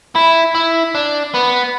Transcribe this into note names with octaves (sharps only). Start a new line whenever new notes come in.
E4
E4
D4
B3